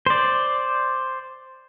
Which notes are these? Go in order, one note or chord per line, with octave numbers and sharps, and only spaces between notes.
C5 D5